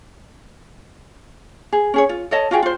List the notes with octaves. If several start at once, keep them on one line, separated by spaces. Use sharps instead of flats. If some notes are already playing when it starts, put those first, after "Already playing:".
G#4
C#4 G#4 C#5
F4
A4 C#5 D#5 A5
F4 F#4 G#4 G5
F4 C5